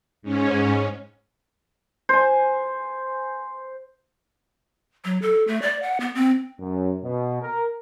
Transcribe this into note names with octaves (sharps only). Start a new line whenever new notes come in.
G#2 C#4
C5 G#5
F#3
A4
A3
D5
F#5
B3
C4
F#2
B2
A#4